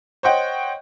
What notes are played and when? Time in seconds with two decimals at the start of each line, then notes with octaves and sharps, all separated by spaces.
0.23 C5 C#5 D#5 F#5 G5